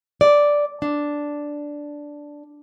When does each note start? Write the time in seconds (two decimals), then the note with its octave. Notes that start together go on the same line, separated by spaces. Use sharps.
0.21 D5
0.82 D4